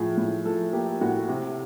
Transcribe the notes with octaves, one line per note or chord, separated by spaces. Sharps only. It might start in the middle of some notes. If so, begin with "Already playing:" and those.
Already playing: A2 F3 G#4
A2
F3 A4
A#3 G4
A2 F#4
C3